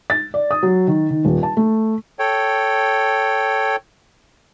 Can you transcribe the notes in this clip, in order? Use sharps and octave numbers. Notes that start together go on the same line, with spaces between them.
A6
D5
D#6
F#3
D#3
D#3
D#1
A5
A3
A4 C#5 G5